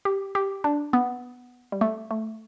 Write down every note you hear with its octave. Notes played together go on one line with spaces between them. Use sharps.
G4
G4
D4
B3
G3
A3
A3